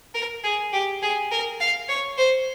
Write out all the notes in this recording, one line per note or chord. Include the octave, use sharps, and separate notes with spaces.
A#4
G#4
G4
G#4
A#4
F5
C#5
C5